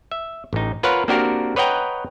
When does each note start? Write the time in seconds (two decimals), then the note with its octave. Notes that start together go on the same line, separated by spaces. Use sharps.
0.11 E5
0.53 A1 D#4
0.83 F4 A#4 B4 C#5 F5 F#5
1.08 A#3 C4 D4 F#4 G4 A#4
1.56 B4 C#5 D#5 F#5 G5 A#5